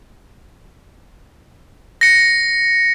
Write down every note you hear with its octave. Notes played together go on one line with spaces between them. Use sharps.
A#6 C#7